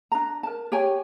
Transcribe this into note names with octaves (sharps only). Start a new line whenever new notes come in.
D4 A#5
A#4 A5
G4 C#5 G5 G#5